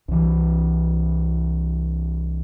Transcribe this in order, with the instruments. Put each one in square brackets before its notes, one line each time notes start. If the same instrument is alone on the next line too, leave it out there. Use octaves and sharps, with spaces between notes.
[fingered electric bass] C2 E3